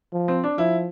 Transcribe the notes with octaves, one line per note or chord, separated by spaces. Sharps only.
F3
C4
D4
F3 E4